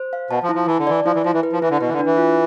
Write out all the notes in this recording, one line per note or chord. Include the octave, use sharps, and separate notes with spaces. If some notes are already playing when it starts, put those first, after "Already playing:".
Already playing: C5
F5
B2 A5
F3
E4
F3
E3 A5
D3
E3 D5
F3 E4
E3
F3 E4
E3
B4
F3
E3 E4
D3
B2 B4
E3
D3
D4
E3
F4